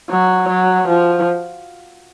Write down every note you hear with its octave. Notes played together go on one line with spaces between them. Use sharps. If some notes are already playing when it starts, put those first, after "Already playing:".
F#3
F#3
F3